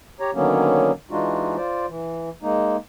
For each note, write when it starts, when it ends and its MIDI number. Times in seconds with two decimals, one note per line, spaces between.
0.20 0.31 67
0.20 0.31 73
0.20 0.31 82
0.34 0.91 50
0.34 0.91 51
0.34 0.91 54
0.34 0.91 58
0.34 0.91 59
0.34 0.91 61
1.11 1.56 52
1.11 1.56 56
1.11 1.56 62
1.11 1.56 63
1.11 1.56 65
1.11 1.56 66
1.57 1.86 65
1.57 1.86 72
1.57 1.86 74
1.87 2.30 52
2.42 2.77 56
2.42 2.77 58
2.42 2.77 63